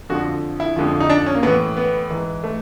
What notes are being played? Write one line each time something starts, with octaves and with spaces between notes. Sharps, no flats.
F2 D3 F3 F#4
E4
F2 D3 F3
D#4
D4
C#4
A#3
A2 E3 B3
B3
G#2 E3
A3